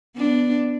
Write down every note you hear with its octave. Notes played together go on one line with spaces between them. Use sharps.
B3 D4